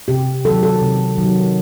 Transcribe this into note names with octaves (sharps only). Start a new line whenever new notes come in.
C3 G4
D#3 F#3 A4
A4
C3
D#3 F#3